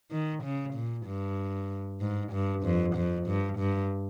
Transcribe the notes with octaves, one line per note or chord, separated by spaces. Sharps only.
D#3
C#3
A#2
G2
G#2
G2
F2
F2
G2
G2